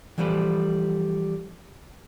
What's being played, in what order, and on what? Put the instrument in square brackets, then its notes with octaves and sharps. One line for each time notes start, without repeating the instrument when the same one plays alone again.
[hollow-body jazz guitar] E3 F3 G3 A3 B4